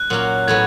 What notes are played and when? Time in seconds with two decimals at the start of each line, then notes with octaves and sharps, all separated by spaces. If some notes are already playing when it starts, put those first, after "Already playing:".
Already playing: F#6
0.10 A#2 F#3 A#3 C#4
0.48 A2 F#3 B3 G#6